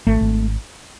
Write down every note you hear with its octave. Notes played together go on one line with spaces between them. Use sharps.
G#1 A3
G#1